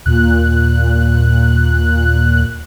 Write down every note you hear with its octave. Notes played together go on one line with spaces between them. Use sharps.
D#2 A#2 F#6